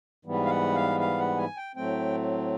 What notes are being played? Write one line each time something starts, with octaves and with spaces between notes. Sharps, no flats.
G#2 E3 G3 B3
F5
F#5
F5
F5
F#5
G#5
G5
A2 F#3 A3 C4 G5